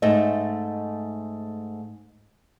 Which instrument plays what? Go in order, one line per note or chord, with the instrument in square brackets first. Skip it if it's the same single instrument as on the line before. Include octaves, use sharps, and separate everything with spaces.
[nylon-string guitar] G#2 A3 D#5 E5